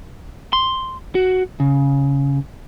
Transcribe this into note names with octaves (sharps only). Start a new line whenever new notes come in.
C6
F#4
C#3